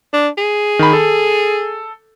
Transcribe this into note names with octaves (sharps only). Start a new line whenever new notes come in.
D4
G#4
D#3 B5
A4